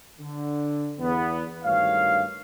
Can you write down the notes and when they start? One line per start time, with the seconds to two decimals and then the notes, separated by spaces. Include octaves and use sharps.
0.18 D3
0.99 E2 B3
1.64 G#1 D2 G2 D#3 C#5 F5